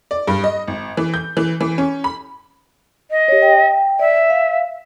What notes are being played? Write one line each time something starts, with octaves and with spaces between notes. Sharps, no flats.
D5
G2
D#5
G#1
E3
G6
E3
E3
C#4
B5
D#5
G4 C#5
G5
D5 E5
F5